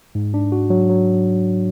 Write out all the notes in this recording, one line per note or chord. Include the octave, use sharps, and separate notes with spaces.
G#2
D4
F#4
F#3
F#3